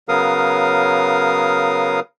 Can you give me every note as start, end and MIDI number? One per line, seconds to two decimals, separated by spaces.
0.09 2.00 49
0.09 2.00 54
0.09 2.00 59
0.09 2.00 70
0.09 2.00 77
0.09 2.00 87